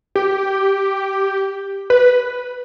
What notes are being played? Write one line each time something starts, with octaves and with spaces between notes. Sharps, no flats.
G4
B4